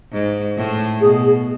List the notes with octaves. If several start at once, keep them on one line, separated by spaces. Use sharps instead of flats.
G#2
A2
B2 G#4
G#4